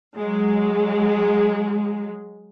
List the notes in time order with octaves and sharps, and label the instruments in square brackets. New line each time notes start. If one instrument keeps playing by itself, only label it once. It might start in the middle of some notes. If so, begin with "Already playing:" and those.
[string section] F#3 G#3